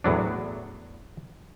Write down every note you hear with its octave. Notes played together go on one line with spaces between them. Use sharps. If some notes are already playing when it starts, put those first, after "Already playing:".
E2 A2 F#3 D4